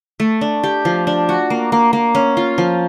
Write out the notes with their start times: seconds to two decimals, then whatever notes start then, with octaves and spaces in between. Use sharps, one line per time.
0.20 A3
0.41 D4
0.63 G4
0.85 F3
1.07 D4
1.29 F#4
1.50 A#3
1.72 A#3
1.93 A#3
2.15 C#4
2.37 F4
2.58 F3